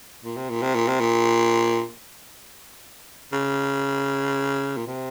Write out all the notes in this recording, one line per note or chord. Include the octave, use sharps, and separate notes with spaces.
A#2
C3
A#2
C3
A#2
C3
A#2
C#3
A#2
C3